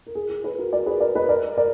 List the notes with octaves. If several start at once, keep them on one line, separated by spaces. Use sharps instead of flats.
A#4
G#4
G#4
G#4 B4
F#4 A#4
A#4 D5
G#4 B4
A#4 D5
B4 D#5
A#4 D5
A#4 D5